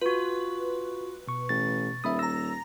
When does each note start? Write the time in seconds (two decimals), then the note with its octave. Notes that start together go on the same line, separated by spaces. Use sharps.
0.01 F4 F#4 B4
1.27 B2 C#6
1.49 A1 A6
2.04 D#1 E5 B5 D#6
2.19 A#5 E6 A#6